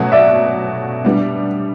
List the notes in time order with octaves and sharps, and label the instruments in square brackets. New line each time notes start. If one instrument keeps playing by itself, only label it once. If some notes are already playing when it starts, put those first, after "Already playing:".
Already playing: [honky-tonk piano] B2 F#3 A3 C#4 F#4
[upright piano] D5 E5
[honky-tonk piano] G3 B3 D4